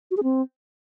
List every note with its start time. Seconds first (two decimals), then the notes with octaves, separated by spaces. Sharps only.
0.11 F#4
0.17 G#4
0.23 C4